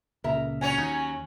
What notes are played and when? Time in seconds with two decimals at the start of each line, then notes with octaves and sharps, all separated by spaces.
0.24 C#2 A#2 C#3 A#4 E5 A#5
0.61 F#3 C#4 C#5 G#5
0.78 D#2 D#4